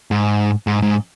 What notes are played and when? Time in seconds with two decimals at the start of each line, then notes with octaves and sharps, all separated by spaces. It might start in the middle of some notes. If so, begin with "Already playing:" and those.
0.11 G#2
0.67 G#2
0.82 G#2